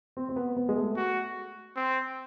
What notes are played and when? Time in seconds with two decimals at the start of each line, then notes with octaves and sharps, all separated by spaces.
0.17 C4
0.29 C4
0.36 B3
0.57 B3
0.69 G#3
0.76 A3
0.96 F#4
1.76 C4